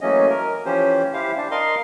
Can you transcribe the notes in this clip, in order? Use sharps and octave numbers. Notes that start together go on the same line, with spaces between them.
E3 F#3 A3 A#3 C#4 D#5
A#4
E3 F3 C#4 G4 C5
E4 G4 C5 F5
D4
A#4 D#5 F5 C6